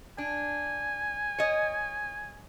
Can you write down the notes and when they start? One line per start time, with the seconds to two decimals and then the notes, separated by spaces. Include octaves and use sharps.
0.18 D4 G#5
1.38 C#5 D#5